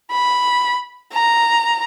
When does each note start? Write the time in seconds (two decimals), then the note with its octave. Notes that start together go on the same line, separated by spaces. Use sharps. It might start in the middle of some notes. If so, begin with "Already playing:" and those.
0.11 B5
1.14 A#5